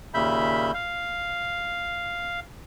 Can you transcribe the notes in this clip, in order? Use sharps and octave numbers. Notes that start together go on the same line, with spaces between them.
D#2 A#2 C#3 E5 B5 G6
F5